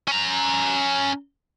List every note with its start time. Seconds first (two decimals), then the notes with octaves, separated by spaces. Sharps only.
0.08 C#4 A#5